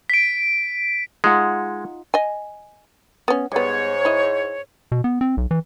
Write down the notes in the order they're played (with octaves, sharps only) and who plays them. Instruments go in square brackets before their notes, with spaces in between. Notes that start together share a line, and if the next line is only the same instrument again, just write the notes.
[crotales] B6 D7
[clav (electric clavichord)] G#3 [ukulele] D#4 F4 F#5
[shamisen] D#5 G#5
B3 C#4
[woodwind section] G#2 C#5 [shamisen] G3 B3
[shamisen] E4 D#5
[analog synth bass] B2
B3
C4
B1
E3